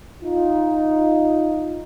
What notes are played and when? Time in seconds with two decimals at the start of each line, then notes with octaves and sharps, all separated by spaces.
0.23 D#4 F4